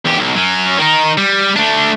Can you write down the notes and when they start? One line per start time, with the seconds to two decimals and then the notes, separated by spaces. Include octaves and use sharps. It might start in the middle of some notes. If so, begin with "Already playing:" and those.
0.05 E2 G4
0.19 B1
0.35 F#3 C#4
0.78 D#3 D#4
1.18 G3
1.56 A3 D4